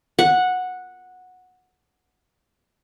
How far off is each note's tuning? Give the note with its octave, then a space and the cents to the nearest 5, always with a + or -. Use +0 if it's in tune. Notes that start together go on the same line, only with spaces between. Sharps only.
F#5 -10